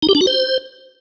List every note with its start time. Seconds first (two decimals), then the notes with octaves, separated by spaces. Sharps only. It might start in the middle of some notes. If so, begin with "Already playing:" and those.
0.02 D#4
0.09 G4
0.15 D4
0.21 F#4
0.27 C5